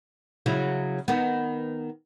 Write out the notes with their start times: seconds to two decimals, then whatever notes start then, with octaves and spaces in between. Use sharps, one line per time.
0.46 C#3 F#3 E4
1.08 D#3 B3